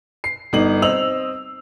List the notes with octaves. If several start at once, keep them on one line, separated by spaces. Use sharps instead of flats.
C7
G1 D#4 F#7
C4 D#5 E6 F7 F#7